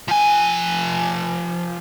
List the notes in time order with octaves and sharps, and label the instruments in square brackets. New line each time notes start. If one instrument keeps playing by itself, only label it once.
[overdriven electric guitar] F3 G#5